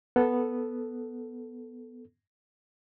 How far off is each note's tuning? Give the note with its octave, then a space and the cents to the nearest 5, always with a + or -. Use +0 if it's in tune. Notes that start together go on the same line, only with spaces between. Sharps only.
B3 +0 A4 +0